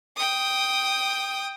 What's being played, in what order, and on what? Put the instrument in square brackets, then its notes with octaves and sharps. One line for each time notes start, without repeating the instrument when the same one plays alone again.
[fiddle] G5 D#6